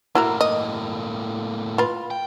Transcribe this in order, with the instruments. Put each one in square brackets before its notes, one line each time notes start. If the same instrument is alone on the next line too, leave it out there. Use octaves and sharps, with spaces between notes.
[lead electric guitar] A2 A#3 [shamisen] E4 F#4 A#4
[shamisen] D#5
F4 B4
[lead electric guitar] G5